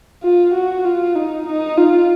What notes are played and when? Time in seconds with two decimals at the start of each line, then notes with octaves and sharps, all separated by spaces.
0.23 F4
0.54 F#4
0.85 F4
1.16 D#4
1.47 D#4
1.77 F4